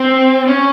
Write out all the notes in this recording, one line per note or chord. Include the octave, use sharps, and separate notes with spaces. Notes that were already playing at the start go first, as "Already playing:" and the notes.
Already playing: C4
C#4